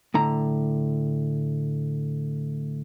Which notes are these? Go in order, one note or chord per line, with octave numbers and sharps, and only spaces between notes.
A2 D3 A#5